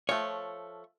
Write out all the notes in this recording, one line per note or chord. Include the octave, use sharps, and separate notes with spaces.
F3 A3 C#5